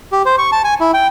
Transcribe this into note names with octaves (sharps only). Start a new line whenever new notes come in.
G4
C5
C#6
A5
G#5
E4
G5